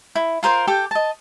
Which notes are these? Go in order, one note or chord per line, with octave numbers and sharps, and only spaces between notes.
E4
F4 A#4 C5 C6
G4 A4 G5
D#5 A5